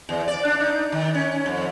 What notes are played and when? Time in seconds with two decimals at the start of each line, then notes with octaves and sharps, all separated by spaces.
0.09 E2
0.28 D5
0.45 D4
0.60 D#4
0.92 D#3
1.15 C#4
1.46 F2